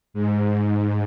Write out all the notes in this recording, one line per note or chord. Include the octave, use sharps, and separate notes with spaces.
G#2